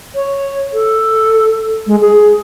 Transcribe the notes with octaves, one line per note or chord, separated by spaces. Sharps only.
C#5
A4
G#3
G#4